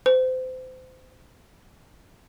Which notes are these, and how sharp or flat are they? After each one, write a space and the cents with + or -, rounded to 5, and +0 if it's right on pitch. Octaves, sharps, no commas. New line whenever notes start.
C5 -30